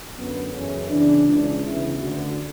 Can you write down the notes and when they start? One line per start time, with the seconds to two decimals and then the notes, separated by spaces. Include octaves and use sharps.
0.16 F#2 D3 B3
0.53 F#2 C#3 E3 C#4
0.89 E2 C#3 E3 D4
1.26 C#2 C#3 E3
1.63 E2 C#3 E3 E4
1.99 D2 D3 F#4